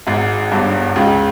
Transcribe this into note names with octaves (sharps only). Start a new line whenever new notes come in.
G#1 G#2
G1 G2
C#2 C#3